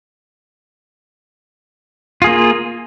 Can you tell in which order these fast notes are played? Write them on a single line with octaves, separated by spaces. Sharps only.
F4 G#4 A#3